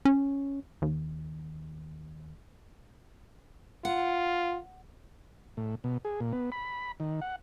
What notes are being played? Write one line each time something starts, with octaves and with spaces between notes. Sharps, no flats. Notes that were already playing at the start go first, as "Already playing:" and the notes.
C#4
D#2
F4 F#5
A2
B2
G#4
A#2
B3
B5
D#3
F#5